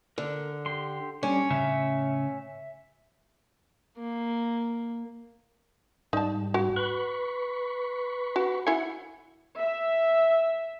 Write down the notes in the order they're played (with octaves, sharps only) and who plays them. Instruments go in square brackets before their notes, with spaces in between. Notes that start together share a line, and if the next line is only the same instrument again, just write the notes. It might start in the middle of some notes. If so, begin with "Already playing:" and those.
[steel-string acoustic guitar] D3 [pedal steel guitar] A#4
[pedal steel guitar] G4 C6
[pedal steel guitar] G3 D4 [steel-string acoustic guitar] C#4
[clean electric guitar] A2 C#3 [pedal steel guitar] E5
[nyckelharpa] A#3
[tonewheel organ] G#2 G3 [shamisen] D#4 A5
[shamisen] F#4
[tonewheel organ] B4 B5 C#6
[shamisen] F#4
[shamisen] E4 G#5 [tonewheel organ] F#5
[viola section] E5